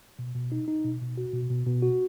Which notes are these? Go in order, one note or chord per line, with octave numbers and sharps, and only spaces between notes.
B2
B2
D#4
D#4
B2
B2
F#4
B2
B2
B2
F#4